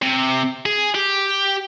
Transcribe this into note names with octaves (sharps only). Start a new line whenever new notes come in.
C3
G#4
G4